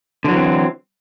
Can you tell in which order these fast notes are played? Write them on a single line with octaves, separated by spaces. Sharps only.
D3 F#3 E3 C4